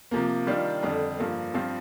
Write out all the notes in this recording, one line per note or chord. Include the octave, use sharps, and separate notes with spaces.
C3 F3 A#3
D#3 G3 D4 F4
F2 D3 G3 D4
G2 F3 A#3
G2 F3 C4 F4